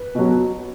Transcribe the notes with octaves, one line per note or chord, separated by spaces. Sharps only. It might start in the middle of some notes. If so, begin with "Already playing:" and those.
Already playing: B4
B2 F#3